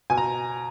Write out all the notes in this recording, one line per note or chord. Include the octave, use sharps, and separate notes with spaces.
B2 G#5
A#5